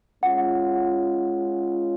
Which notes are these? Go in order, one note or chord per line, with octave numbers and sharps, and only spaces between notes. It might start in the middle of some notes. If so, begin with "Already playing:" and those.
G#3 C#4 F4 F#5